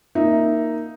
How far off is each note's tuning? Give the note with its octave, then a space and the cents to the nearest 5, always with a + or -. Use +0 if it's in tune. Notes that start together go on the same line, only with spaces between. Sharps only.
A#3 +0 D#4 +0 E5 +0